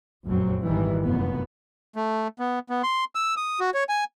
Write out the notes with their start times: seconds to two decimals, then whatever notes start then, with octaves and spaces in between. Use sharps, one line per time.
0.25 F1 A#1 F#2 F#3 C4
0.63 G#1 D#3 E3 G3
1.03 F1 F#2 A#3 B3
1.96 A3
2.39 B3
2.70 B3
2.83 C6
3.15 E6
3.37 D#6
3.60 F#4
3.74 C#5
3.89 G#5